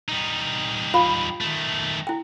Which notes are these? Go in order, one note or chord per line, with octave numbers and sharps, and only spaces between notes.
G3 D#4
F4 F5 B5
D#3 A3
E4 G5